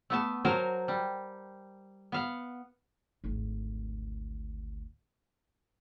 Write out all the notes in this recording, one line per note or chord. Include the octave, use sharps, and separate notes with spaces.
A3 B3 A5
F#3 F#4 A#4 C5 A5
G3
B3 F5 F#5
G#1 D2